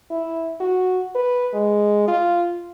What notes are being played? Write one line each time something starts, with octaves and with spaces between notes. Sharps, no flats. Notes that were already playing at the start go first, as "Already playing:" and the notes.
E4
F#4
B4
G#3
F4